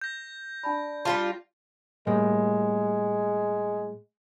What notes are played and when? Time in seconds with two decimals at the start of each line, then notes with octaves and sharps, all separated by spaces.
0.01 G6 A#6
0.63 D4 D5 A5 B5
1.05 G3 G#3 F4 A5
2.07 A2 G3 G#3 A#3